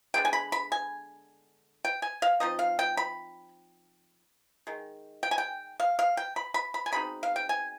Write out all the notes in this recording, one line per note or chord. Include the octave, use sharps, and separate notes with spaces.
D3 G#3 B3 D4 G5
G#5
B5
B5
G#5
G5
G#5
F5
F3 C4 D#4 D#5
F5
G5
B5
D#3 G#3
G5
G#5
G5
F5
F5
G5
B5
B5
B5
G#5
B2 G#3 C4 D#4 B5
F5
G5
G#5